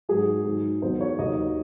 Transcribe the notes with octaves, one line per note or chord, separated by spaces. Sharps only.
G#2 F#3 G#4
G#2 D#3 F#3
E2 D#3 F#3 C5
C#5
D#2 D#3 F#3 D#5